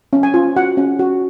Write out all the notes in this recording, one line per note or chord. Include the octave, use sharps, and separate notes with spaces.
C#4
G#5
F4
F#4 F#5
C#4
F#4